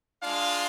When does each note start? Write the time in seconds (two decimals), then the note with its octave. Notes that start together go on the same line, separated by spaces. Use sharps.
0.22 G#3 D4 F4 F5